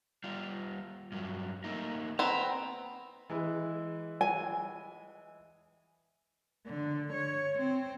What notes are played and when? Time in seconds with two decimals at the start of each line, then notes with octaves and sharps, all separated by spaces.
0.24 G3 F4
1.12 G2 F#3
1.64 A3 A#3 D#4
2.19 B3 C4 A#5
3.30 E3 G#3 E4
4.21 G#5
6.66 D3
7.13 C#5
7.60 C4